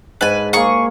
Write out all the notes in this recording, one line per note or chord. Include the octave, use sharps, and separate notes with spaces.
G#2 B4 G#5 A5
A#3 G#4 A#5 C#6